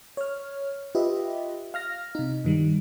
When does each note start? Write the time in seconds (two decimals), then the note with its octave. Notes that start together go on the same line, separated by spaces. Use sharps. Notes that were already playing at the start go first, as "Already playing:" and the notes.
0.17 C#5 F6
0.95 F4 G4 B4 D#5 E5
1.74 F5 F6 A#6
2.15 C3 D#4
2.45 G2 D#3 G3